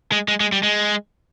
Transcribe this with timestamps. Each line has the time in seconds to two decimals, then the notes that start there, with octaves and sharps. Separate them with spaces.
0.12 G#3
0.28 G#3
0.40 G#3
0.52 G3
0.63 G#3